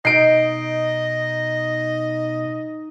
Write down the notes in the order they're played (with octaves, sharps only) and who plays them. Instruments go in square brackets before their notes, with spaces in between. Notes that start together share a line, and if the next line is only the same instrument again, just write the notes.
[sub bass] B2 [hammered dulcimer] D#4 [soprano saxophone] D#5 [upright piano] C7 D7